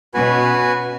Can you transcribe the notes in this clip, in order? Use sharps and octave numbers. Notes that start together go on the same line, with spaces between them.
B2 C#4 F#4 B4 G#5